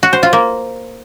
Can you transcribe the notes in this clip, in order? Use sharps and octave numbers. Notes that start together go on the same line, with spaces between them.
F#4
C5
F4
A#3